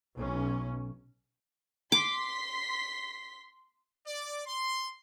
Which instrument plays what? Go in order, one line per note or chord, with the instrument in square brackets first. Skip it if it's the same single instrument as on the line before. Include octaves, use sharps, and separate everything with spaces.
[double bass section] B1 C#4
[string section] C6 B6 [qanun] D6
[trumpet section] D5
C6